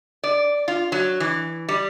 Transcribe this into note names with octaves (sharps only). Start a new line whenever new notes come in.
D5
F4
F#3
E3
G3